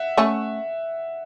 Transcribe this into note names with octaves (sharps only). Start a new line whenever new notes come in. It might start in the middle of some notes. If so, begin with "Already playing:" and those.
Already playing: E5 F#5
A3 C#4